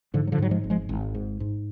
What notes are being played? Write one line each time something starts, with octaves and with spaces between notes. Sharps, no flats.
G#2 D3 F3
F#3
D3 F3
G#2 F#3
F3 G#3
G#1
F3 G#3
G#1
G#2
G#2